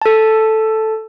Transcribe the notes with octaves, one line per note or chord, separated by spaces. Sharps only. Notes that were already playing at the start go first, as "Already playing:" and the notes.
A4 A5